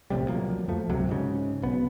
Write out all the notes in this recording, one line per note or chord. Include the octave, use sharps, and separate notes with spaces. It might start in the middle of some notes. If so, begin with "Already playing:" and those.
A#1 A2 C3 G3
D2 F3 F#3 A#3
F2 F3 A3
G#1 C#2 C3 F#3
G#2 C#3
B1 B3